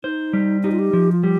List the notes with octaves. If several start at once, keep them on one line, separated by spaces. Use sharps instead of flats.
D#4 C5
G3
D#4 G4
F4
G4
F3
F4
G3 G4